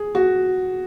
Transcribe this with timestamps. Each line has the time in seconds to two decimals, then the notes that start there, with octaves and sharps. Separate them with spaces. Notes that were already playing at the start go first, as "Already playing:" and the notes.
Already playing: G#4
0.15 F#4